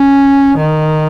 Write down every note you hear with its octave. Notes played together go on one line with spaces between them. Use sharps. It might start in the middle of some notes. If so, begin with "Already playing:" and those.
Already playing: C#4
D#3